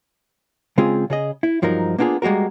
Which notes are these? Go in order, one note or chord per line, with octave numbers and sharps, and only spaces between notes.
C#3 G#3 C4 F4 G#4
C#3 G#4 D#5
E4
G2 F3 F#3 D#4 A#4
A#3 B3 D4 F4 G#4
G3 G#3 A#3 F#4 A#4